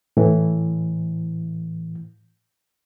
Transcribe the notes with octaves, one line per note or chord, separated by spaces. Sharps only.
A2 E3